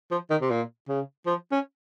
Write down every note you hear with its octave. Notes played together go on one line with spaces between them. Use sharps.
F3
D#3
C3
A#2
C#3
F3
C#4